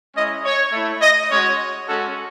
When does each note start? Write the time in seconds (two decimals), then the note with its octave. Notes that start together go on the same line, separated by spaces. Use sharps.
0.15 G#3 C#4 E4 D#5
0.44 C#5
0.72 A3 E4
1.02 D#5
1.30 G#3 C#4 F#4 C#5
1.86 G#3 C#4 F#4 A4